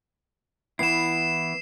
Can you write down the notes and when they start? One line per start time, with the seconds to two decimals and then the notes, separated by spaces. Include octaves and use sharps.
0.79 E3 B3 E4 C7 E7